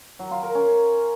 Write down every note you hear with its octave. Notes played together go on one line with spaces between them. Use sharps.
F#3
F4
A#4
C#4